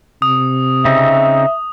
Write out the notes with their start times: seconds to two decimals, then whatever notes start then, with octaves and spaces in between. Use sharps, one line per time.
0.22 C3 D#6
0.85 C#3 C4 D#4 E5